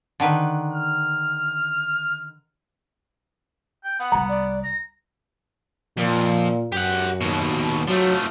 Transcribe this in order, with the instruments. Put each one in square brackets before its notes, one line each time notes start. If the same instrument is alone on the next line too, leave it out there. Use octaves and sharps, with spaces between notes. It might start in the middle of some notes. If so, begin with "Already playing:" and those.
[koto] D3 D#3 B4
[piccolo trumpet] F6
[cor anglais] G5
[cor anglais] B3 [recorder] F#5
[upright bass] C2 G3 [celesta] A#5
[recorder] D5
A#6
[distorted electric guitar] F2 [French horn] A#2
[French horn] F#2 [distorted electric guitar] G4 F#5
[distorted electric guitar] D#2 B2
[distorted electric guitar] F3 A3 [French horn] F#3